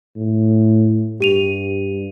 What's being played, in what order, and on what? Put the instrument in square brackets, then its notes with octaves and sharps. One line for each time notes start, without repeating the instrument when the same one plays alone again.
[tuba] A2
[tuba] G2 [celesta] G4 D#7 F7